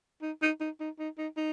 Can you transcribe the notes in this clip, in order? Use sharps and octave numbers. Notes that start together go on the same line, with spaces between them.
D#4
D#4
D#4
D#4
D#4
D#4
D#4